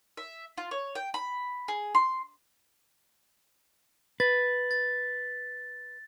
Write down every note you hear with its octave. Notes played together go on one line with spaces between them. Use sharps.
E5
F4
C#5
G5
B5
G#4
C6
B4 A6
A6